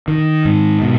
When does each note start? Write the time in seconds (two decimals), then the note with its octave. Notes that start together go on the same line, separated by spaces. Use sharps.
0.08 D#3
0.45 G#2
0.82 B2